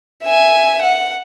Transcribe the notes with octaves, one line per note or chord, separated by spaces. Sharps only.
E5 G#5
F#5